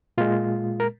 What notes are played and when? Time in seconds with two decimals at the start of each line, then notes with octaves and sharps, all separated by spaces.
0.18 A#2 G#3 F4
0.80 A#4